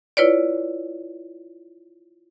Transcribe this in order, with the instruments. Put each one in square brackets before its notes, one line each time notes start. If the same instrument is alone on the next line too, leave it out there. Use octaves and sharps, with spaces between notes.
[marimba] E4 F4 B4 C#5 D5